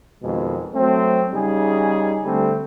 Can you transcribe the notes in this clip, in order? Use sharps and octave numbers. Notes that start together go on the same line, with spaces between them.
F2 B2 D#3 G#3
F#3 A3 C4
C#3 G3 D#4 G#4
D3 G3 A3 C4